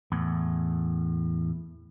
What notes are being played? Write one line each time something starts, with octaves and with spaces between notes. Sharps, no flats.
E2 A2